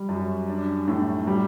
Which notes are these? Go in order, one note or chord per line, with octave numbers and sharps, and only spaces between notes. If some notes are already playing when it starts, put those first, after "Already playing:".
Already playing: G3
F#2
D4
A2
G3